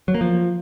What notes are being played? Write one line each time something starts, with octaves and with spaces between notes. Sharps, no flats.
F#3
A#3
F3